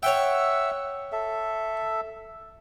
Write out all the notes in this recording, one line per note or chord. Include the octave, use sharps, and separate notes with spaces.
C#5 E5 F#5 G5 E6
A4 E5